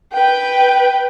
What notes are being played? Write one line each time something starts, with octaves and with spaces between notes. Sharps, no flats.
B4 G5